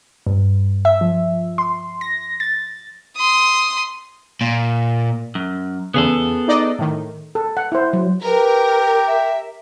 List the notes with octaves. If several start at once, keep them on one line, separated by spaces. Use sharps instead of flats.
G2
E5
F3
C6
A#6
A6
C6 D#6
A#2
F#2
E2 C#3 B3 G#4 A4
D#4 D5 D#5
A2 D#3
A4
F#5
E4 C5
F#3
G4 A#4 B4
E5